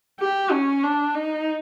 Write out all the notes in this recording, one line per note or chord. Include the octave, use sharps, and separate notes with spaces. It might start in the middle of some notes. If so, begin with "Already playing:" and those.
G4
C#4
D4
D#4